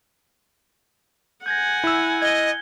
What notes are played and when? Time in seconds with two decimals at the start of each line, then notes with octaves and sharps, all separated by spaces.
1.46 F#5 G#5 G6 G#6 A#6
1.84 E4 E6
2.22 D#5 G#6 G7